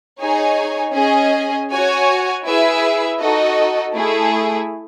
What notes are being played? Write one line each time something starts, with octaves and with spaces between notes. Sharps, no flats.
D#4 G#4 C#5 G#5
C#4 G#4 D#5 G#5
F#4 C#5 G#5
E4 G#4 B4 E5
D#4 F#4 A4 D#5
A3 E4 G#4